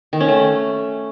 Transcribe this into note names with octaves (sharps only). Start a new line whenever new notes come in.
D#3
C#4
A3